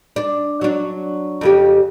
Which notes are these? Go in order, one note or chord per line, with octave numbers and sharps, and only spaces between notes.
D4
F#3 D4
F2 C#3 G4